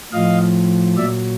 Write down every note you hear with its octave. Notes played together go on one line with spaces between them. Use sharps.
A2 F3 D#5 F5
A#2 F#3 D5 E5